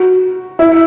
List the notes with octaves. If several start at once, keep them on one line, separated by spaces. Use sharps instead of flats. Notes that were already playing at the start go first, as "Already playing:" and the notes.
Already playing: F#4
E4